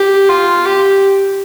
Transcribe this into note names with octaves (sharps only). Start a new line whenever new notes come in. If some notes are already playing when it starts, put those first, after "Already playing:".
Already playing: G4
F4
G4